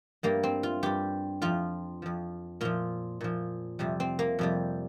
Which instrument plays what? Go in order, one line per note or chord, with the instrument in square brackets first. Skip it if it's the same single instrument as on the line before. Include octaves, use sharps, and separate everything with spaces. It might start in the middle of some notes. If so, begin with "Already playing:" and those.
[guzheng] G2 G3 A#3
C4
F4
G2 G3 G4
F2 F3 F4
F2 F3
A#2 F3 F4
A#2 F3
F2 C3 G3
C4
A#3
F2 C3 G3